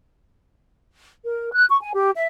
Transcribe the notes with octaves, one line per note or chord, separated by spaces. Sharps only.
A#4
F#6
C#6
G#5
G4
E5